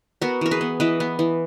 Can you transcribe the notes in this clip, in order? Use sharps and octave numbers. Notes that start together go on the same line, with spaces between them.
B3 F#4 A#4
E3 A#4
G#4 B4
B3
E3 B4 D#5
B3
E3